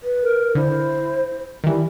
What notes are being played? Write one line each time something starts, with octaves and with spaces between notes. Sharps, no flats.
B4
A#4
D3 E4 C5
D#3 E3 G3